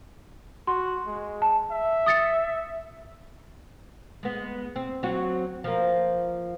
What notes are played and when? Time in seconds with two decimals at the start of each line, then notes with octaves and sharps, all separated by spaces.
0.67 F#4 C6
1.07 G#3
1.42 A5
1.71 E5
2.06 D#6 A6 C#7
4.23 G#3 B3
4.76 C4
5.03 F#3 C4 F#4
5.64 F3 A#3